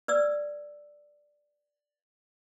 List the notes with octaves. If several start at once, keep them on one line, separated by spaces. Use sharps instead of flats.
B4 D5 E6